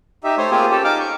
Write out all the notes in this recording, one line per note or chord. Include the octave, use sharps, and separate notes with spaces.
D#4 G4 E5
A3 C5 C#5
A#3 C4 F4 G4 G#4
C#4 G4 A4
D#4 F5 G5 D6 F6
C#6